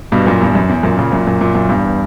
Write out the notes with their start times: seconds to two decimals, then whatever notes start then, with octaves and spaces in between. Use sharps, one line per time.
0.12 G2 B2
0.26 F#2 A#2
0.40 E2 G2
0.55 F#2
0.69 E2
0.83 F#2 A#2
0.98 A#2 C#3
1.12 F#2 A#2
1.27 F#2 A#2
1.41 F#2 A#2
1.55 F#2 A#2
1.69 E2 G2